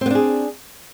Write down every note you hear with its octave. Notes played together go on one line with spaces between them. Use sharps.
B3 C4 D4 G#4